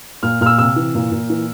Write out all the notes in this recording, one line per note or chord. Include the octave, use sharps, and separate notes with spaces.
A#2 F6
A#2 F6
E6
C3 E6
E3
A#2
A#2
E3